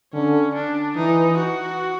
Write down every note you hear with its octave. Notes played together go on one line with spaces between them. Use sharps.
D3 C#4
D4
E3 D#4
F#4